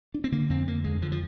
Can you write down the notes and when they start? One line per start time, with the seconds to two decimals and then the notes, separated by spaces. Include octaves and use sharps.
0.14 D4
0.24 C4
0.32 D3 A#3
0.50 F2 C4
0.67 D3 A#3
0.84 F2 G#3
1.02 D3 F3
1.12 F3